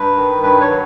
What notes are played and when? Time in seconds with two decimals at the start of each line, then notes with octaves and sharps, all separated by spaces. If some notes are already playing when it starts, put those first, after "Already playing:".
Already playing: G2 B4
0.17 D#3
0.43 G2 B4
0.61 C#5
0.70 F#3